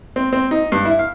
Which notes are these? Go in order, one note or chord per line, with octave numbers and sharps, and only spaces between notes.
C4
C4
D#4
G2
E4
F5